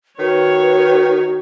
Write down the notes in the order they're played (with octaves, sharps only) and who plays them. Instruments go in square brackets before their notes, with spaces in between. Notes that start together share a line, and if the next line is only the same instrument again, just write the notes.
[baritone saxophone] D#3 [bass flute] F#4 [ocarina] B4 [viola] C#5